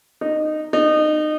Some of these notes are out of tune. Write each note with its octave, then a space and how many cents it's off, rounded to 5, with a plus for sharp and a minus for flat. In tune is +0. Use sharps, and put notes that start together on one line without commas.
D#4 -15
D#4 -25